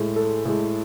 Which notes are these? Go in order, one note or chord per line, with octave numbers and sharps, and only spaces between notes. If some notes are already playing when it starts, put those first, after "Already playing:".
Already playing: A2 G#3
A4
A2 G#3